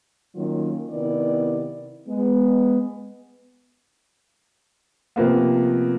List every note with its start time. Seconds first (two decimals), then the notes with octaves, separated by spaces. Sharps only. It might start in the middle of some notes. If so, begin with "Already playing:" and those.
0.35 D#3 F#3 A#3 C#4 F4
0.90 C3 D#3 B3 E4 D5
2.07 G#3 B3
5.16 C3 F3 A#3 B3